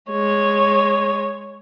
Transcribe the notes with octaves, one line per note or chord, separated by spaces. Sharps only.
G#3 C#5